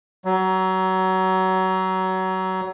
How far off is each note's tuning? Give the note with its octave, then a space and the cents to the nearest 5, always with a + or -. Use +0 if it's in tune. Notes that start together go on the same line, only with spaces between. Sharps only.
F#3 +25